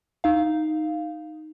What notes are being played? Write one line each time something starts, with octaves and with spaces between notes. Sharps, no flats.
D#4 F5